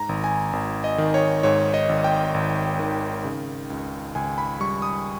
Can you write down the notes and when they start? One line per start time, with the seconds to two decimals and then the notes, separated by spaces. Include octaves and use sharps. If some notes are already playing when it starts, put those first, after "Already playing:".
Already playing: G#2 A#5
0.09 G#1
0.24 G#5
0.53 G#1
0.84 D#5
0.98 D#3
1.14 C#5
1.43 G#2 C#5
1.74 D#5
1.89 G#1
2.04 G5
2.34 G#1
2.79 D#3
3.24 C#3
3.70 C#2
4.15 C#2 G#5
4.38 B5
4.60 G3 C#6
4.82 D#6